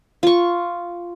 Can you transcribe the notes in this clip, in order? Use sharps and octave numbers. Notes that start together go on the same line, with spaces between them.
F4 C#6